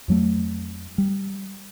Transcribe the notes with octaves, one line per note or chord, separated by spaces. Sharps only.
F2 F#3 A3
G3